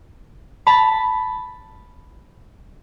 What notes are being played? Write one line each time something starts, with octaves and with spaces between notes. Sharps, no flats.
A5 B5